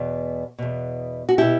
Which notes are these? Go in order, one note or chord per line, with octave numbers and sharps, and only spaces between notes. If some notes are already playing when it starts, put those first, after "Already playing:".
Already playing: E2 B2
E2 B2
F#4
B2 E4 G4